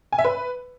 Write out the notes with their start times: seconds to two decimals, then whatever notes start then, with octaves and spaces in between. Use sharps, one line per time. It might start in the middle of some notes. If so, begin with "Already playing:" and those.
0.12 G#5
0.19 E5
0.25 B4